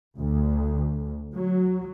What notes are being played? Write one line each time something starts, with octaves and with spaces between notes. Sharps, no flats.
D2
F#3